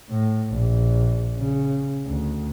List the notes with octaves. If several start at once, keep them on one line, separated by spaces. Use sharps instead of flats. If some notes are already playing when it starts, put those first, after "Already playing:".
A2
A#1
C#3
D2